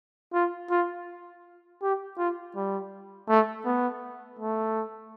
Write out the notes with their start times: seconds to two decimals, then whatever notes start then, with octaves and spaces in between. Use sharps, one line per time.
0.34 F4
0.71 F4
1.82 G4
2.18 F4
2.56 G3
3.29 A3
3.65 B3
4.39 A3